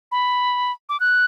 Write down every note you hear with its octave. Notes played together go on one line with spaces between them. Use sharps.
B5
D6
F#6